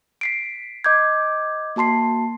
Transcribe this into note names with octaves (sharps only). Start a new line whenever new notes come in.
B6 C7 D7
D#5 D6 G6 G#6
A#3 F#4 A5 C6 C7